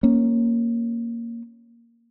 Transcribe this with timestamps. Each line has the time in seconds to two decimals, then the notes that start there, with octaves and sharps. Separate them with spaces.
0.03 A#3 C#4